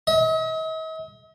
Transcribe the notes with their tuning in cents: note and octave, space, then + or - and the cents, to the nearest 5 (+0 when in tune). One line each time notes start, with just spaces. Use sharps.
D#5 +45